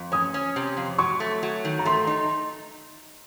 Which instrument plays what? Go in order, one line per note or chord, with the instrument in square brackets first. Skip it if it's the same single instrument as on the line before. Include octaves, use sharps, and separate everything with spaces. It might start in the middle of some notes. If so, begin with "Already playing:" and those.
Already playing: [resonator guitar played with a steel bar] F2
[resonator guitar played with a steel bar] C#4 [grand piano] D#6
[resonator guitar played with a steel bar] C#4
C3
F2
[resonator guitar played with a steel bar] F#3 [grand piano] C#6
[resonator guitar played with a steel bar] A3
F#3
D#3
[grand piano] A#5
[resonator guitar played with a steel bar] A3 [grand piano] C6
[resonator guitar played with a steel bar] D#4